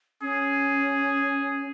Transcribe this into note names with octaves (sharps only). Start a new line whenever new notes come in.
C#4 G#4